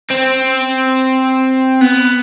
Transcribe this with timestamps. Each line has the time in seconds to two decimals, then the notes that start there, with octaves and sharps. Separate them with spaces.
0.10 C4
1.81 B3